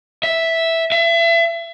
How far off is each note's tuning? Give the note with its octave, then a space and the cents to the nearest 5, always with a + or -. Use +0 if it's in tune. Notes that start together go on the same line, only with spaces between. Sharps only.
E5 -5
E5 +30